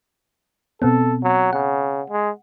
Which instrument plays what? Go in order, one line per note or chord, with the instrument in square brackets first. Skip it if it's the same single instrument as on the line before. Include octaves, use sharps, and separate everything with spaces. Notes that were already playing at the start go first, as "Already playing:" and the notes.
[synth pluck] B2 B3 C4 [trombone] A4
[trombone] F#3
[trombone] C#3 [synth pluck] F#5
[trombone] G#3